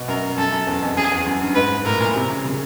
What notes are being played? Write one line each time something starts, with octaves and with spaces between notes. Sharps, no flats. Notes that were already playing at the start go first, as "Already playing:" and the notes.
Already playing: B2
F#2 A#4
F#2 A4
F#2
E2
F2
F#2 G#4
E2
F#2
G2
G#2 B4
A2 A#4
A#2
C3
C#3
C#3